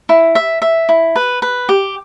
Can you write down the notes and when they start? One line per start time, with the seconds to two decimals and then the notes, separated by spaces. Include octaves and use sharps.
0.09 E4
0.35 E5
0.62 E5
0.89 E4
1.16 B4
1.42 B4
1.69 G4